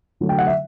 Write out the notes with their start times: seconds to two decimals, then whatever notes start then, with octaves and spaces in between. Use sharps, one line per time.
0.20 D3 F#3 A3
0.29 G5
0.38 F#5
0.47 E5